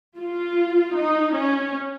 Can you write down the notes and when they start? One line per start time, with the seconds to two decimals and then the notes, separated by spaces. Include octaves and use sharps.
0.18 F4
0.95 D#4
1.33 C#4